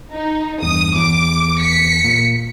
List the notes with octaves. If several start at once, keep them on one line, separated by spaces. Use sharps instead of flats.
D#4
E2 G2 D#6
E2 D6
B6 C#7
A#2 A#3